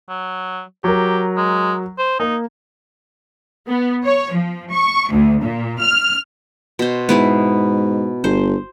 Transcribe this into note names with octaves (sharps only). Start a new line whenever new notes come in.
F#3
F#3 G4 A#4
G#3
C5
A#3 D#4
B3
C#5
F3
C#6
D2
A#2
F6
B2 C5
G#2 B3 E4 G#4
G1 C5